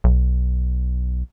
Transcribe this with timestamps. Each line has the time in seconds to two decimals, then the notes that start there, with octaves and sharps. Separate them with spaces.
0.04 B1